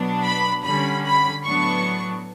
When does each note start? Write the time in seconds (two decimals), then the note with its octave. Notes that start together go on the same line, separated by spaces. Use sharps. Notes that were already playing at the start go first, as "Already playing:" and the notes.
Already playing: B2 F#3 B3 D4
0.24 B5
0.65 D3 G3 C#4 B5
1.05 B5
1.46 A2 F#3 B3 D4 C#6